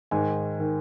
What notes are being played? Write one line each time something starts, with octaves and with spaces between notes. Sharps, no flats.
G#2 D#3 G#5
D#3